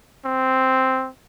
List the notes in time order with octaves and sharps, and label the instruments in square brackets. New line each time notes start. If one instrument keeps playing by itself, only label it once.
[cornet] C4